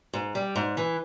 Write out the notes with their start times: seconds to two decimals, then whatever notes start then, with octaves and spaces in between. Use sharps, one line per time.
0.13 G#2
0.35 G3
0.56 G#2
0.77 E3